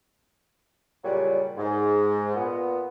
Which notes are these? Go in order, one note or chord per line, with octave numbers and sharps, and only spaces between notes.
A#2 C#3 F#3 G3
G#2
A#2 B3